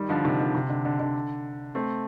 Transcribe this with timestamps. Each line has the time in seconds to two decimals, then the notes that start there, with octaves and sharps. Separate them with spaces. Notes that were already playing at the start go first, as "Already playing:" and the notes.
Already playing: D#3 G3
0.09 D3 F3
0.24 C3 D#3
0.40 D3
0.55 C3
0.69 D3
0.85 D3
1.00 D3
1.75 A3 C4